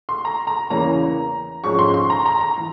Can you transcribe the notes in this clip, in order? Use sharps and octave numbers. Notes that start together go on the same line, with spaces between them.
C6
A#5
A#5
E2 C#3 E3 A#3 C#4 A#5
G#2 F3 G#3 C#4 C#6
C6
C6
A#5
A#5
A#5
E3